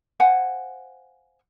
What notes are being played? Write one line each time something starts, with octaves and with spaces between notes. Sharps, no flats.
C5 F5 F#5 G#5